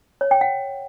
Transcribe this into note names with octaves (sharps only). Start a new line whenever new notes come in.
C#5
G5
F#5